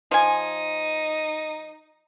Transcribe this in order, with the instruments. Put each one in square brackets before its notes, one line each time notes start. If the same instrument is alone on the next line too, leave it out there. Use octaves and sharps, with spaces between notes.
[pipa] F3 G#5 [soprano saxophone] D#4